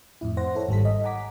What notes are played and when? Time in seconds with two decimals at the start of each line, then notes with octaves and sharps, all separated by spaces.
0.21 F2 A2 E4
0.37 C5 F#5 A#6
0.55 E4 A4 C#5
0.69 G#1 G3 A4 B6
0.85 D#5
1.04 F#5 G#5 A#5 D6 B6